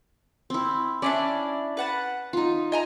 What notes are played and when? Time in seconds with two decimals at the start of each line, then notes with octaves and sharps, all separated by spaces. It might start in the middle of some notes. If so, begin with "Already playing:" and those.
0.50 C4 E4
1.02 C#4 D4 E4 D5
1.77 B4 F#5 A5
2.33 D#4 F4
2.72 D#5 G#5 A#5